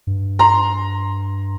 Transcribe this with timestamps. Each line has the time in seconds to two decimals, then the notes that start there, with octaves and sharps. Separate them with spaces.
0.07 G2
0.39 A#5 C6